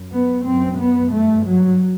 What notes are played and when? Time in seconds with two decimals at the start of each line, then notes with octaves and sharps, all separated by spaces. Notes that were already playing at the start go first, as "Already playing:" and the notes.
Already playing: F#2
0.13 B3
0.46 F#2 C4
0.79 B3
1.13 G2 A3
1.47 F#3